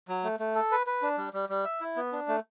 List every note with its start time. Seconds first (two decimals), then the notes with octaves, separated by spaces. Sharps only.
0.08 F#3
0.24 A3
0.40 A3
0.55 A4
0.71 B4
0.87 B4
1.02 D4
1.18 G3
1.34 G3
1.49 G3
1.65 E5
1.81 E4
1.96 B3
2.12 D4
2.28 A3